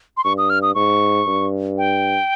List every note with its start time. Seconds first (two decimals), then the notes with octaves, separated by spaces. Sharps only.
0.17 C6
0.24 G2 C#6
0.38 D#6
0.50 F6
0.62 D#6
0.75 G#2 C#6
1.27 G2
1.78 G5